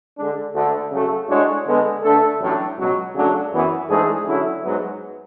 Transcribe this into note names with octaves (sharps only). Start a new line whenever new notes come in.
D3 G#3 D4
D2 D3 A3
C#3 F#3 A3
A2 G#3 D4 F#4 C#5
D3 G#3 B3
D3 A3 D4 A4
A1 A2 F#3 A3 D4
C#2 B2 F#3
C#3 F#3 A3 D4
F#2 E3 B3 F#4
G#2 E3 A3 D4 G#4
D3 F#3 C#4 E4
G#2 F#3 B3